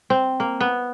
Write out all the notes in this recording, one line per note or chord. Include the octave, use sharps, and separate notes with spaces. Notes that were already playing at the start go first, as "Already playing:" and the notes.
C4
A#3
B3